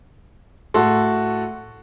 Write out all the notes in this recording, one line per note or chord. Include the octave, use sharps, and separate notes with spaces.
A2 F#4 A4 C6